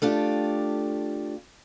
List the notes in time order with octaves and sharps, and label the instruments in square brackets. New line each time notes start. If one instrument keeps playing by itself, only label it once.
[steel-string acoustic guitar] A3 D4 F4 G4